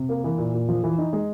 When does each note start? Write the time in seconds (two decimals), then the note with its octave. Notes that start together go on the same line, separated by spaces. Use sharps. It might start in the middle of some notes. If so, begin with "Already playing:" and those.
Already playing: C3
0.09 A#3
0.24 E3
0.38 A#2
0.54 A#2
0.69 F3
0.83 E3
0.98 D#4
1.13 G#3